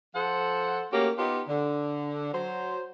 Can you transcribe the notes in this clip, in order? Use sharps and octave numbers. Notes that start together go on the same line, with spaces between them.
F3 A4 C5 F#5
A3 A#3 C#4 F#4 G4
B3 D#4 F4 G4
D3
F#3 C5